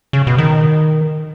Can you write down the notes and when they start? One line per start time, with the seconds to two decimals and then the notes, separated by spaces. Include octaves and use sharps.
0.13 C#3
0.27 B2
0.38 D#3